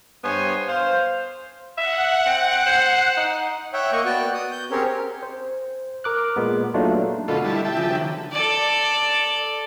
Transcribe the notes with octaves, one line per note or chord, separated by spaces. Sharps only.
G2 B3 C5 C#5 G#5
C5 F5
E5 F#5
C4
C5
D#4
C#5 E5 F#5 G5
A#3 D#5 F#5 C#6
B3 F#4 D5 G5 F#6
D#6
G6
C4 C#4 G4 G#4 A#4 C#5
C5
A#4 D6 F#6
A#2 G#3 B3
F#3 A3 A#3 D4 D#4 F4
B2 D3 A3 F4 A4
G3 E4 A5
E5 G5 A5
G2 C#3 F3
D3 D#3 F#3
A4 D5